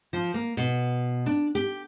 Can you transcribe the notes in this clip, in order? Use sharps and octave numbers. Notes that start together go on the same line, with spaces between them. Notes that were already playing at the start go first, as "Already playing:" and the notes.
F3
A#3
B2
D4
G4